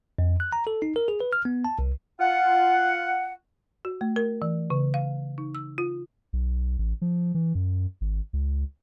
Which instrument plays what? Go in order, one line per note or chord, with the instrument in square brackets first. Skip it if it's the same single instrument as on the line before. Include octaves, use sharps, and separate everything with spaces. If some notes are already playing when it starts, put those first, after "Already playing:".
[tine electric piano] F2
F#6
A#5
A4
D#4
A#4
G#4
B4
F6
B3
A5
C2
[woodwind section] F4 F#5
[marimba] F#4
A3
A#4
E3
C#3
F5
D#4
E6
F4
[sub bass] B1
A1
F3
E3
F#2
G#1
C#2